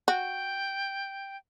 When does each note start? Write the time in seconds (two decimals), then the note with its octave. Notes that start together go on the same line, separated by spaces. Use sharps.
0.08 F#4 G5